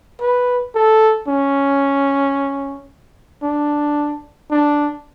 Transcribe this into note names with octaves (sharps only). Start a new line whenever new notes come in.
B4
A4
C#4
D4
D4